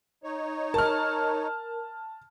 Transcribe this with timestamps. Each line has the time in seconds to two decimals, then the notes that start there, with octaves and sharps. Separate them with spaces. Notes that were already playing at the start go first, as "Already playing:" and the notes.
0.24 D#4 C#5
0.74 A#4 A5 F6